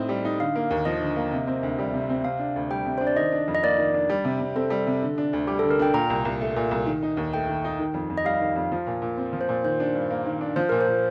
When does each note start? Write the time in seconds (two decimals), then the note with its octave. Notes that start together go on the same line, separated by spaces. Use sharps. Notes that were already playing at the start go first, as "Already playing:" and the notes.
Already playing: A2 C4 D#4
0.09 G3
0.25 D#4
0.40 D3 F5
0.56 A#3
0.71 D#2
0.85 F3 D#5
1.01 D3
1.16 A#3
1.33 C3
1.47 C4
1.63 D2
1.79 G3
1.94 C3
2.10 C4
2.24 C3 F5
2.39 D4
2.56 D2
2.71 G3 G5
2.85 C3
2.98 D4 C5
3.07 D5
3.16 D#3 D#5
3.32 D4
3.48 F2
3.55 D#5
3.63 A#3 D5
3.78 D#3
3.94 D4
4.10 G3
4.25 C3
4.40 C3
4.56 C4 A4
4.70 G3
4.87 C3
5.02 D3
5.18 D4
5.33 D2
5.47 G3 G4
5.59 A4
5.63 D3
5.71 A#4
5.79 D4 G5
5.94 A#2 A#5
6.10 C2
6.25 C2
6.41 A3
6.56 A#2
6.71 C2
6.86 D#3
7.03 D#4
7.17 D#2
7.33 A3 G5
7.49 D#3
7.64 D#4
7.79 D#3
7.94 F2
8.10 F2
8.18 D#5
8.25 G3 F5
8.41 D#3
8.56 F2
8.72 F3
8.87 A#2
9.02 A#2
9.17 C4
9.33 F3
9.41 C5
9.49 A#2
9.64 D#3 C5
9.80 D4
9.95 G2
10.11 A#3
10.26 D#3
10.41 D4
10.56 F3 C5
10.69 A#2 A#4
10.81 C5
10.87 A#2